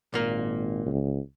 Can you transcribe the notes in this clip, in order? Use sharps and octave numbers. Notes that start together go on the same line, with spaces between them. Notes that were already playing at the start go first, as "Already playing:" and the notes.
G#1 A#2 A#3
C#2